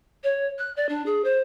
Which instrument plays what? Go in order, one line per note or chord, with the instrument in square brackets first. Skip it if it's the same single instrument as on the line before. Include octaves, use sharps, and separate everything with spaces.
[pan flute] C#5
F#6
D5
D4
G#4
C5